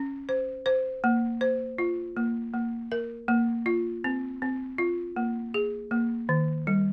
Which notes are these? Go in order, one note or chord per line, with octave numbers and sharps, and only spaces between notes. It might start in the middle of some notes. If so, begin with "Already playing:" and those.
Already playing: C#4
C5
C5
A#3
C5
F4
A#3
A#3
A#4
A#3
F4
C4
C4
F4
A#3
G#4
A#3
D#3
G3